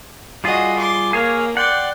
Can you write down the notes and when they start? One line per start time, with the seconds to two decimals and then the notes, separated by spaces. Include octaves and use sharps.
0.44 G3 F4 F#4 G#4 D#5
0.79 C6 D6
1.13 A#3 G#4 C#5 F5
1.57 D5 F#5 G5 C6